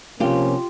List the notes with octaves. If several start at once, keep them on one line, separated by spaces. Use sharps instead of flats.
C3 F3 A#3 C#4 F4 G4